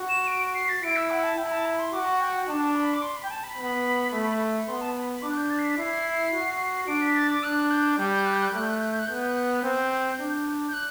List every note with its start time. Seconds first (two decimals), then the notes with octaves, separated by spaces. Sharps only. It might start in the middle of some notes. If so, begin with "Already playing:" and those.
Already playing: F#4
0.09 E7
0.28 D7
0.55 C7
0.69 A6
0.83 E4 D7
0.96 E6
1.11 F#5
1.23 A5
1.37 E4 G5
1.46 B5
1.52 A5
1.66 B5
1.79 C6
1.92 F#4 D6
2.06 F#5
2.20 G5
2.34 G5
2.48 D4 A5
2.76 B5
2.94 D6
3.02 C6
3.17 B5
3.23 G5
3.31 A5
3.44 B5
3.57 B3
4.12 A3
4.59 B5
4.68 B3 C6
4.81 A5
4.95 B5
5.09 B5
5.22 D4 D6
5.30 F#6
5.37 G6
5.50 A6
5.59 C7
5.65 B6
5.77 E4 C7
6.33 F#4
6.88 D4 D7
7.01 B6
7.15 A6
7.30 D6
7.43 D4 F#6
7.71 G6
7.98 G3 G6
8.26 F#6
8.34 G6
8.41 F#6
8.48 G6
8.53 A3 F#6
8.63 G6
8.70 F#6
8.78 G6
8.85 F#6
8.92 G6
8.99 F#6
9.06 B3 G6
9.14 F#6
9.22 G6
9.29 F#6
9.63 C4 G6
10.19 D4
10.69 G6
10.74 F#6